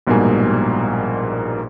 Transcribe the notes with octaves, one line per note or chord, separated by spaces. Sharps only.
A#1 G#2 B2 G3 A#3 G#5